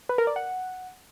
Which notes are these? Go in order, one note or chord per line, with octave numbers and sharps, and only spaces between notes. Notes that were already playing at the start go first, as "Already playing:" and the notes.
B4
A#4
D5
F#5